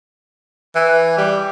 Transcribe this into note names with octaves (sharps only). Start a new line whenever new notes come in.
E3
G3